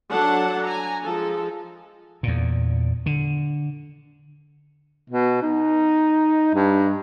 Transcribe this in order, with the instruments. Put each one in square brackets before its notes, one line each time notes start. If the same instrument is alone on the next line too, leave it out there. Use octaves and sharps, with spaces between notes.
[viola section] F#3 D4 A4 F#5 A5
G#5 A#5
F3 G#3 A4
[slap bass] E2 A#2
D3
[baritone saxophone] B2
D#4
G2